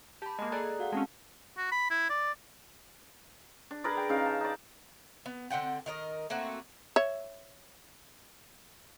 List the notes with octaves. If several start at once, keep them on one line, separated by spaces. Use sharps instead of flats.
G4 A5 B5
G#3 A#3 D#5
G#4 A4 D5 A#5 F#6
F#4 F5 F#5
G#3 C4 C#4 A5
F#4
B5
E4
D5
D4
G#4 A#4 B4 D5
G5
C#3 D#4 F5
A5
D#4 D5
B3
D3 C4 F#5 G5
D#3 A#4 D#5
A3 A#3 C4 F#4
C#5 E5